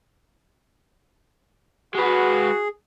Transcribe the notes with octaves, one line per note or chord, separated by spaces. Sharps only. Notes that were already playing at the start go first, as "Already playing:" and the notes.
G#3 F#4 G#4 B4